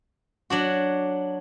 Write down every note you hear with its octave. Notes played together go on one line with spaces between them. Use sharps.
F#3 D4 F#4